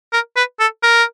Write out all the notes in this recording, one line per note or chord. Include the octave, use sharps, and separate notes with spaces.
A#4
B4
A4
A#4